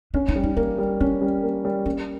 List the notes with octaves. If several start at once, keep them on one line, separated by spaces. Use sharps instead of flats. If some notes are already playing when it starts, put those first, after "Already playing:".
C#4 D4
D#4
G3
D#4
A#3 C#4
G3
C4 C#4
G3
A#3
G3
A#3 C#4